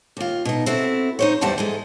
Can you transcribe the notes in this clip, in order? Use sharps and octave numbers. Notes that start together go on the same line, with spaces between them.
D#2 F4
B2 D#4
C4 E4 F#4 A4
D#4 C5 C#5
E2 G3 C5 F#5 A5
G#2 G#3 A4